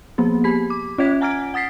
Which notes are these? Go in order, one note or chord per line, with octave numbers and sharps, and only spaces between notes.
F3 A#3 B3 G#4
G4 B5 B6
D6
C#4 F4 C#5 E5 G#6 B6
F#5 G#5 A#5 F6 G#6 D7
F#5 D#6 A6 B6 C7